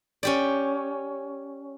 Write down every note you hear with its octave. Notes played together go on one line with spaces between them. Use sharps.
C#4 G4 D5